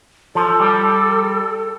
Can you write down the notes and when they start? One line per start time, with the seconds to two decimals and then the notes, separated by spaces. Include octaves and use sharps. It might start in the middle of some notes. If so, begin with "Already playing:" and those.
0.35 F3 A4
0.60 G3